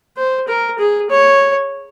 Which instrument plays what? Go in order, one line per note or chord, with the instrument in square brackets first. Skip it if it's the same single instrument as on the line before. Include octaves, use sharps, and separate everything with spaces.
[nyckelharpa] C5
A#4
G#4
C#5